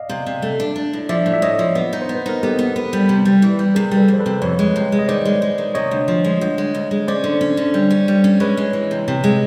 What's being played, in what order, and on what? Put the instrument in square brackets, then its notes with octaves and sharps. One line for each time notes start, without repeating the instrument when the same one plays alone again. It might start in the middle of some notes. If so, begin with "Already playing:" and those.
Already playing: [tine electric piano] D5 D#5 F5
[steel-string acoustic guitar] C3
C3
A3
D4
D4
A2
[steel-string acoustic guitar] F3 [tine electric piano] D5 E5
[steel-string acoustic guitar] A2
[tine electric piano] E5
[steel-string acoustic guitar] A2 [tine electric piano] C#5 D#5
[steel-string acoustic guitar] F3
B3
D#4
[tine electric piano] C5
[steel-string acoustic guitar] B3
[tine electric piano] B4
[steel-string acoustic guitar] D#4 [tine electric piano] A#4
[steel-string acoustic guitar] B3 [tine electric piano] G4 A4
[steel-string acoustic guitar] B3
B3
G3
C3
G3
E3
G3
[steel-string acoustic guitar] C3 [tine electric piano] G#4 A#4
[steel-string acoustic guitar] G3
[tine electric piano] A4 B4
[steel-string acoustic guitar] F2 [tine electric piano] C5
[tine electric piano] A4 B4
[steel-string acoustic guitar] C3
[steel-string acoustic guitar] F2 [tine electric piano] B4 C#5
[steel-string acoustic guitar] G#3
C3
G#3
[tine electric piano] D#5
[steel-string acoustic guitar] D#3 [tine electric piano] C5 D5
[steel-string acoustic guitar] G#3
G#3
D#3
[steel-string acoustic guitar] C3 [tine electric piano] C#5 D#5
[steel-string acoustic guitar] D2
F3
G#3
D2
G#3
D2
G#3
[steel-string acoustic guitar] C#4 [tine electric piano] C5 D5
[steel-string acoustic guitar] D3
C#4
D3
G3
C#4
G3
C#4
[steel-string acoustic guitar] G#3 [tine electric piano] B4 C#5
[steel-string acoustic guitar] G#3
E3
C3
C3
G#3